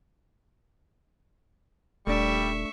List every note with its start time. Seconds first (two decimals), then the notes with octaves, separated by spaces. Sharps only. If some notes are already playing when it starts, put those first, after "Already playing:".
2.07 D#1 G3 A3 D4 E5 C#6